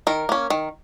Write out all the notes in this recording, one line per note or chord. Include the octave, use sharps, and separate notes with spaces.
D#3 A#4
A#3 C#4
D#3